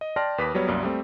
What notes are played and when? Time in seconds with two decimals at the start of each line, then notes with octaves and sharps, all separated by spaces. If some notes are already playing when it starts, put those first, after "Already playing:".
0.01 D#5
0.16 D5 G5 A5 C6 F6 A#6
0.38 D#2 B4 D6 D#6 B6
0.55 F#3 G3 B3 C#5
0.67 C2 F#2 A#3 D5
0.83 G3 A3 C4